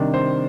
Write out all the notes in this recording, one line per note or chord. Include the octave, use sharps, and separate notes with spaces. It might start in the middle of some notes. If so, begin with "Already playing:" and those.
Already playing: C3 D#3 G3 D4
C5